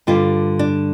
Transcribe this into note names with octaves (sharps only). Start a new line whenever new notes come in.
G2 D3 G3 F4
D4